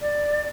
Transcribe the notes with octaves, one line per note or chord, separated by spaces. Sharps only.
D5